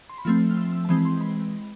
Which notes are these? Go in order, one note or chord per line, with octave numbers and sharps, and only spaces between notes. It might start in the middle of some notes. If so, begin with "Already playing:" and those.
C6
B5
F3 A3 C4 C6
F6
E6
E6
A5
E3 G#3 C4 B5
C6
B5